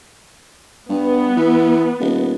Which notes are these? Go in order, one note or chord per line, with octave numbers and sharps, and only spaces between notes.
G2 B3
E3
D#1